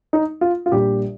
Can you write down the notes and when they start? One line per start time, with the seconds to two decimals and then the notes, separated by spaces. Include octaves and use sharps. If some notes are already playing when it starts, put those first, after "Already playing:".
0.13 D#4
0.41 F4
0.66 F4
0.72 A#1 A#2 G3 G4